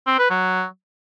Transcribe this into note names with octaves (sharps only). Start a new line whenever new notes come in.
C4
B4
F#3